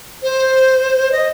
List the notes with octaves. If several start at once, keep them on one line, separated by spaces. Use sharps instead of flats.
C5
D#5